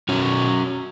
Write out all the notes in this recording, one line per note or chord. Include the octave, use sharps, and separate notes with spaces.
B2 C#4 F#4